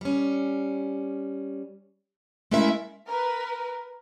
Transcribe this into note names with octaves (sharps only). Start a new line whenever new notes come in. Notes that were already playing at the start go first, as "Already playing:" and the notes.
G3 C#4
G#3 A3 C#4 E4 A#4 E5
A#4 B4